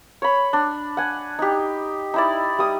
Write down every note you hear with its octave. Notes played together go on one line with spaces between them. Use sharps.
C#5 B5
D4
F#5 G#5
D#4 G4
D#4 E4 D5
G3 D#6